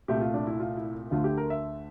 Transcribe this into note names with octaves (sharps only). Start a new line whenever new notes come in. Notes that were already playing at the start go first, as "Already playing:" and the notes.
C2 A#2 A3 G4
F4
D4
E4
F4
E4
D2 D3 A3 F4
G4
A#4
E5